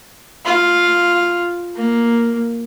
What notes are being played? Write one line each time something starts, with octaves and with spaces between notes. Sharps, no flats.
F4
A#3